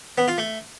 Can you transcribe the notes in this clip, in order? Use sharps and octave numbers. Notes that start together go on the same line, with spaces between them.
B3
F4
A3